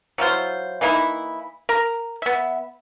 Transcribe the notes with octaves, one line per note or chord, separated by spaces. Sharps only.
F#3 E4 F4 C5
E3 A#3 D#4 E4
A#4 A#5
B3 E5